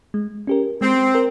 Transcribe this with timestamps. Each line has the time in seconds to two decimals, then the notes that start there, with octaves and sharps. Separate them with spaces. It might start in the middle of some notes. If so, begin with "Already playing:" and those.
0.14 G#3
0.47 C#4 G4 A#4
0.81 G#3 C4
1.15 A#4